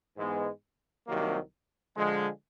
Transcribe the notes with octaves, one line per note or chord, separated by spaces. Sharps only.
G#2 E3 G#3 B3
C2 C3 D#3 F#3 A#3
D3 F3 G#3